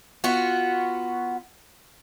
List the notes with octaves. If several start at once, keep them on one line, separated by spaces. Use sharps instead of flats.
B3 F4 F#4